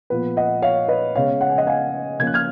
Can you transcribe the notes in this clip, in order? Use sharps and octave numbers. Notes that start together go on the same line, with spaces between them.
A#2 F3 B3 B4
D#5 F#5
C#5 F5
B4 D#5
C#3 G#3 B3 C#5 F5
F#5
G#5
D#5 F#5
F5 G#5
C#3 F3 A#3 C#4 G#6
F#6
F6 G#6